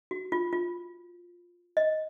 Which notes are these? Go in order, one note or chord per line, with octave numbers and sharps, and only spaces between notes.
F#4
F4
F4
D#5